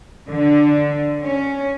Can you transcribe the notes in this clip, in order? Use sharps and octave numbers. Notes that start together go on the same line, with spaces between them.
D3
C#4